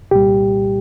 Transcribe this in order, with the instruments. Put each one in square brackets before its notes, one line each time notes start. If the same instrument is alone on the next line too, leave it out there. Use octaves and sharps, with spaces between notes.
[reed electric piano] C2 A#2 G3 G4